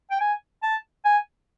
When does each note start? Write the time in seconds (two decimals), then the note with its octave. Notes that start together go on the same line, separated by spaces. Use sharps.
0.11 G5
0.20 G#5
0.63 A5
1.05 G#5